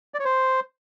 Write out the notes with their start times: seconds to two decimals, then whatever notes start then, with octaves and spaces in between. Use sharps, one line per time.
0.14 D5
0.19 C#5
0.25 C5